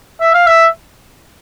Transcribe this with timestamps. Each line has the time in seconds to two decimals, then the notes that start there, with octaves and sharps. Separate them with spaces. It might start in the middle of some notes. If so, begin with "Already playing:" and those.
0.21 E5
0.34 F5
0.46 E5